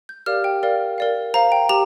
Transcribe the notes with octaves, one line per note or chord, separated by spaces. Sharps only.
G6
G4 A#4 D5 F5 F6
G5
A#4 D5 F5
A#4 D5 F5
C5 F5 A#5
G5
G4 A#5